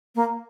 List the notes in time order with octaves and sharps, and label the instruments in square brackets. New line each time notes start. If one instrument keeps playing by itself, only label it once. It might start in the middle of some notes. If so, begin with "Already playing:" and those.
[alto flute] A#3